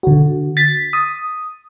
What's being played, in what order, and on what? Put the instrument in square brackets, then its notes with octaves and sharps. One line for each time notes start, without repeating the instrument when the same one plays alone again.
[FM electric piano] D3 F#4
A6 B6
D#6